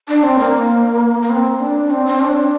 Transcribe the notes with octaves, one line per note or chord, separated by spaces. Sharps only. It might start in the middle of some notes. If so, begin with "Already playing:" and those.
D4
C4
A#3
A#3
C4
D4
C4
C4
D4